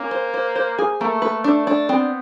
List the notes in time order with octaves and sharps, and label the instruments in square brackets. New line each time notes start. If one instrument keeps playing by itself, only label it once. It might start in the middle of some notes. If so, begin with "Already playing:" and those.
Already playing: [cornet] A#3 [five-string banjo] C#4
[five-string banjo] C5
C5
C5
G#4
[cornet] A3 [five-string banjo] A#3
[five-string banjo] B4
[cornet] A3 [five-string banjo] D4
[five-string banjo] D4
[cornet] B3 [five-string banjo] C4